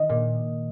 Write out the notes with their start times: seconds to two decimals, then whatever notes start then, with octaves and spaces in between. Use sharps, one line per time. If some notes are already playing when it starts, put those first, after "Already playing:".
Already playing: D#3 D#5
0.09 A#2